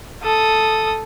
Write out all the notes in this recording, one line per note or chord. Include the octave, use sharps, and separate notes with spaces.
A4 D#6